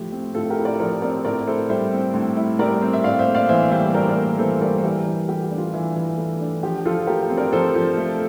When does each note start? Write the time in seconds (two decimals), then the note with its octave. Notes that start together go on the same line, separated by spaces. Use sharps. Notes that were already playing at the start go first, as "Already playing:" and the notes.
Already playing: A2 F3 E4 G4
0.12 C4
0.35 A2 F4 A4
0.50 G4 A#4
0.57 E4
0.65 A#4 D5
0.80 F3 A#4 D5
1.02 C4 A#4 D5
1.25 A2 A#4 D5
1.47 E4 A4 C5
1.70 G3 C5 E5
1.93 C4
2.14 A2
2.37 E4
2.59 G3 A#4 D5
2.82 C4
2.93 E5
3.04 A2 D5 F5
3.19 C5 E5
3.27 A#3
3.35 D5 F5
3.49 E3 C5 E5
3.72 G3 C5 E5
3.94 A2 A#4 D5
4.09 A#4 D5
4.16 A#3
4.38 E3 A4 C5
4.61 G3 A#4 D5
4.78 C5
4.83 E3 G4 A#4
5.06 E3
5.29 A3 G4
5.43 G4
5.51 D4
5.58 F4
5.74 E3
5.96 E3
6.18 A3
6.41 D4
6.63 F3 G4
6.85 F3 F4 A4
7.07 A3 G4 A#4
7.30 C4
7.37 A#4 D5
7.53 F3 A4 C5
7.75 F3
7.97 A3